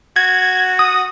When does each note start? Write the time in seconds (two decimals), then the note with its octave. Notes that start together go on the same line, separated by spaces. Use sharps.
0.16 F#4 G#6
0.79 D#6